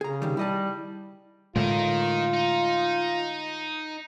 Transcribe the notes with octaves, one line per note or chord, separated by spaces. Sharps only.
C#3 G#4 A#5
C3 D#3 G3
G3 E4 D#5 A5
A2 D3 G#3 D#4 F4 A#4
D#4